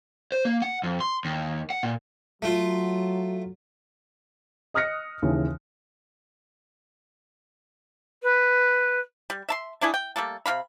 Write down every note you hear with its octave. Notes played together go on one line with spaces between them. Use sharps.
C5
A#3
F#5
F2
C6
D#2
F#5
A#2
F#3 A3 F4
D#5 D#6 F6 F#6 A#6 C#7
D#2 C#3 E3
B4
G3
E5 A5 C6
A3 D4 E4 G#4
G5
G3 A3 A#3 A4
C3 F#4 F5 B5